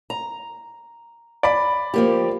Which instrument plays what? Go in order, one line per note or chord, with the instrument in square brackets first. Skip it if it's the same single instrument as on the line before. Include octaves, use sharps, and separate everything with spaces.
[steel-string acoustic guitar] A#5
[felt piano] D5 B5
[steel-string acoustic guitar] F3 A#3 G4